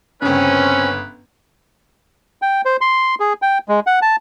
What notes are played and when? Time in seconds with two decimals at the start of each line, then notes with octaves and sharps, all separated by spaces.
0.22 G1 C#3 C4 C#4 B4
2.42 G5
2.65 C5
2.81 C6
3.20 G#4
3.42 G5
3.68 G#3
3.87 F#5
4.02 A5